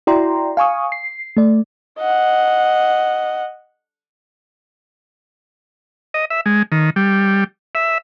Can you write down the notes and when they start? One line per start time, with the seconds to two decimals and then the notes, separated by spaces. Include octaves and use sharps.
0.07 E4 F#4 D5 G5 A#5 C6
0.57 F5 G#5 C#6 D#6
0.92 C7
1.37 A3 D5
1.98 D#5 F#5
6.14 D#5
6.30 E5
6.46 G#3
6.72 D#3
6.96 G3
7.75 E5